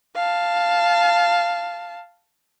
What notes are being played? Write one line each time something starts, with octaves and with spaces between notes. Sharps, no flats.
F5 A5